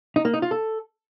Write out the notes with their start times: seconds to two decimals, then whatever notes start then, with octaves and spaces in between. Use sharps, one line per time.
0.16 D#4
0.25 A#3
0.34 D#4
0.42 F4
0.51 A4